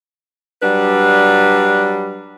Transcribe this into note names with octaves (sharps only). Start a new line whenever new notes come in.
F#3 G3 D4 B4